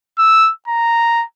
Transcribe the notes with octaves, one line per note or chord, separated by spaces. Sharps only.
E6
A#5